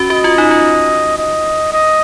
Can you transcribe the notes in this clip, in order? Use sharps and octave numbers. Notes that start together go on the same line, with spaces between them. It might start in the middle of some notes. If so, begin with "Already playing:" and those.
Already playing: C#4 F#4
F#4 D#5
F4
D#4
F4
D#5
D#5